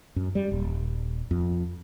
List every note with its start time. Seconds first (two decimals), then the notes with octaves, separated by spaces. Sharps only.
0.16 F#2
0.35 G3
0.52 D#1
1.31 F2